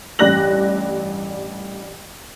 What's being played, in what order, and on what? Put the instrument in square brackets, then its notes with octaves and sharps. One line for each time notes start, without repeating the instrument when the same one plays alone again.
[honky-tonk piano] A1 G2 D5 F#6 A#6 F#7